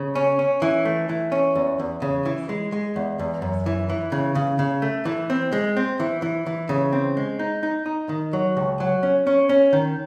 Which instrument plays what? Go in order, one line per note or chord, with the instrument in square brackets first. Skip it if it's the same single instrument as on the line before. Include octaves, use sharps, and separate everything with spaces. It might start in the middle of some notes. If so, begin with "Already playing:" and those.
Already playing: [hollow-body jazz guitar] C#3
C#4
C#4
E3
A3
E3
C#4
E2
E2
C#3
E3
G#3
G#3
E2
E2
F#2
E3
E3
C#3
C#3
C#3
A3
E3
C4
G#3
C4
E3
E3
E3
C#3
C4
G#3
D#4
D#4
D#4
D#3
F#3
C#2
F#3
C#4
C#4
C#4
D#3